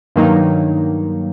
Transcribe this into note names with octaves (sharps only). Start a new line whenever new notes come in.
G2 D#3 F#3 A#3 D#4